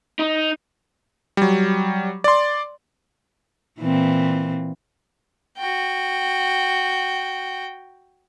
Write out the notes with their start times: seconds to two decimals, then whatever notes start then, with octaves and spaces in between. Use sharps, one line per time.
0.19 D#4
1.37 F#3 G3
2.24 D5 C6
3.80 A#2 E3 C4
5.58 F#4 G5